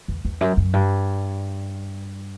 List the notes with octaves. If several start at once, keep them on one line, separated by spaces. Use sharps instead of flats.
E2
E2
F#2
F#2
G2